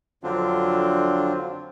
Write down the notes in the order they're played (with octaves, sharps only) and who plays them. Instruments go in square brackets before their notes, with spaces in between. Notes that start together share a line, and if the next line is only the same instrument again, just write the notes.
[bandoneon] F2 D3 F#3 C4 D4 F4